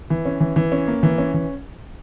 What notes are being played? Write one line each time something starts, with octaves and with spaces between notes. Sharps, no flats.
E3
C#4
E3
E3
C#4
A#3
E3
C#4
E3